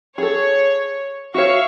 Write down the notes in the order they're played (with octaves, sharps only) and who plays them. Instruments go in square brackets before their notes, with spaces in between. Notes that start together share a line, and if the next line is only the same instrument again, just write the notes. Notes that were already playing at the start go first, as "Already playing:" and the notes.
[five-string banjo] G#4 A4 [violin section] C#5
[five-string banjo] F#4 C#5 [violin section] E5 F5 C#6